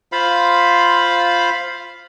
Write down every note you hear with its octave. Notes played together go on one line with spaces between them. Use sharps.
F4 C5 F5 B5